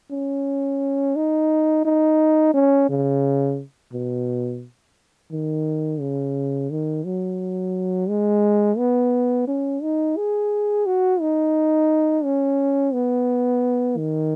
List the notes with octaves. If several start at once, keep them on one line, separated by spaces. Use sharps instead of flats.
C#4
D#4
D#4
C#4
C#3
B2
D#3
C#3
D#3
F#3
G#3
B3
C#4
D#4
G#4
F#4
D#4
C#4
B3
D#3